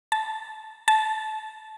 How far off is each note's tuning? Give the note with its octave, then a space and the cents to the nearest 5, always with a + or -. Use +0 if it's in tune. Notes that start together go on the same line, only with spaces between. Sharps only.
A5 -15
A5 -20